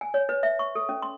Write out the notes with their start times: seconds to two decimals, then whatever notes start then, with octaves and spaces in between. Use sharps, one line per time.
0.01 G#5
0.14 C#5
0.29 B4
0.43 E5
0.59 C#6
0.75 A4
0.89 C#4
1.02 C6